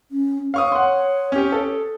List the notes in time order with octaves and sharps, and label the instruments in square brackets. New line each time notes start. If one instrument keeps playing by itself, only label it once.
[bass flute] C#4
[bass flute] C#5 [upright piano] F5 C#6 D#6
[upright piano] F#5 C6
C#4 G4
A4